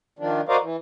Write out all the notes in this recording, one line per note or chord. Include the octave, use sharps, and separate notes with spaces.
D#3 F3 D4
F#4 A#4 C5 D5 D#5 F5
E3